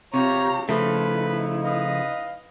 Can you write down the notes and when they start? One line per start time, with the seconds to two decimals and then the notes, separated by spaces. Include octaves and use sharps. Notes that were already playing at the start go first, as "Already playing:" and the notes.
0.14 C3 F4 G4 C#5 A#5
0.69 C#3 F3 A3 D#4 E4 B4
1.63 B4 D#5 F5